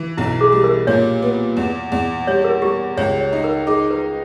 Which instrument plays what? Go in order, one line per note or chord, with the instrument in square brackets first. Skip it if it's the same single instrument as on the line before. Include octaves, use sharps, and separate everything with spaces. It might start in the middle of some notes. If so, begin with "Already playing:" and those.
Already playing: [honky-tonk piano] E3
[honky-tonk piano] B1 [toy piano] E4
[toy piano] G#4
[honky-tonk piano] G3
[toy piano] A#4
[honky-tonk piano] A#2 [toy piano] C#5
[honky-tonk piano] B3
E2
E2
[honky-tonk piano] G3 [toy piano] C#5
[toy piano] A#4
[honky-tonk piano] G3 [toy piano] G4
[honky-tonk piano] C#2 [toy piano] C#5
[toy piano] C#5
[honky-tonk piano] D#4
[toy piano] A#4
[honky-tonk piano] D#4 [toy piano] G#4
[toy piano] B4